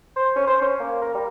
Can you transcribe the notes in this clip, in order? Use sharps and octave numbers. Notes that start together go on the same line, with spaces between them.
C5
C#4
C5
C#4
A#3
A#4
G3